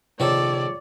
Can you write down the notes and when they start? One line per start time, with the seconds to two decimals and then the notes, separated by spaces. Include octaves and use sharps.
0.20 A#1 C3 D#3 F4 A4 C#5 D5